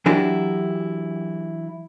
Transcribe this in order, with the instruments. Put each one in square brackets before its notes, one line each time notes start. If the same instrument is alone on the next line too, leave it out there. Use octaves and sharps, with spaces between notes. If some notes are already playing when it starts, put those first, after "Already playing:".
[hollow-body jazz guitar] E3 F#3 D4 E4 F#4 G4